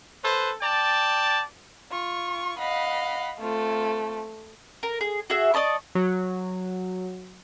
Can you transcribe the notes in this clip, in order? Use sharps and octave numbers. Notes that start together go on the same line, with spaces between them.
A4 B4 C5
D5 G5 A5
F4 C#6
D#5 F5 F#5 B5
A3 C4 F4
A#4
G#4
F#4 G#4 E5
D5 D#5 A5 C#6
F#3